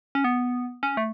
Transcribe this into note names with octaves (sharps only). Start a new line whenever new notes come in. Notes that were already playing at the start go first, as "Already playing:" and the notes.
C#4
B3
C#4
A3